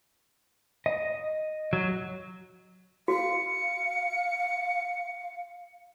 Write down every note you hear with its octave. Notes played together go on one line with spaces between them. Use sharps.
D#5
F#3
F#4 F5 C#7